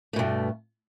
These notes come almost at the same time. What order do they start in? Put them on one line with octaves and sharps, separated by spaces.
A3 B2 G2